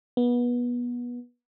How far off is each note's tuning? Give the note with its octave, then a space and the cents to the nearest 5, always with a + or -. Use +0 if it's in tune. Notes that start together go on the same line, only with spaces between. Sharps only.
B3 -25